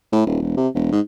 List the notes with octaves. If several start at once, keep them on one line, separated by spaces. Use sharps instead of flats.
A2
D#1
E1
C3
E1
G#2